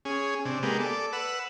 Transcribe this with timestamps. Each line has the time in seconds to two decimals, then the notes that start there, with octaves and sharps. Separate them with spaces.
0.05 C#4 G#4
0.45 C3 D4
0.63 G#3 A#3 B3 G4
0.81 A4 D5
1.13 B4 F#5 E6